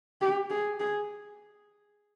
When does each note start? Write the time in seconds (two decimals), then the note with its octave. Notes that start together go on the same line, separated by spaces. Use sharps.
0.21 G4
0.50 G#4
0.80 G#4